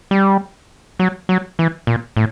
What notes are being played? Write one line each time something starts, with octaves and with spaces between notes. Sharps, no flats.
G3
F#3
F#3
E3
A#2
A2